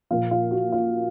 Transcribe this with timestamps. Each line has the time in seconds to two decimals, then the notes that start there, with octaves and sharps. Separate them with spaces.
0.11 A#2 F3 A#3 F4
0.31 F4
0.51 F#4
0.72 F4